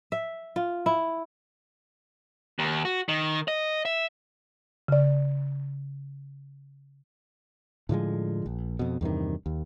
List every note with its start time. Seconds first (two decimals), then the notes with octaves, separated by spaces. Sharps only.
0.12 E5
0.56 F4
0.86 E4
2.59 D#2
2.85 F#4
3.09 D#3
3.48 D#5
3.85 E5
4.88 C#3 D5
7.89 A2 D3 F3 G#3
8.46 A#1
8.79 F2 B2
9.01 E2 G2 C3 D#3
9.46 D#2